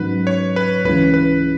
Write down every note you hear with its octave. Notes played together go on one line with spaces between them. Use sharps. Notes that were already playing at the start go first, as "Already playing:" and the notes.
Already playing: G#2 D#3 F#3 C#4 B4
C#5
B4
C#2 C#3 E3 B4
B4